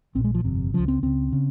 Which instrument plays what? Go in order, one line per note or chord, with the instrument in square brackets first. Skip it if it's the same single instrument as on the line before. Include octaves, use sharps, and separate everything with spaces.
[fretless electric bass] A#1 A#2 C4
G#3
F3
G1 F2 C3
C#2 C#3 F3
C4
C#2 C#3 C4
C#3